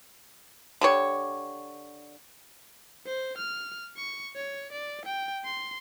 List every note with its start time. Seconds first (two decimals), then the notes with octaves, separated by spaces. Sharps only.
0.81 D3 G4 C#5
3.06 C5
3.38 F6
3.97 C#6
4.36 C#5
4.72 D5
5.05 G5
5.44 C6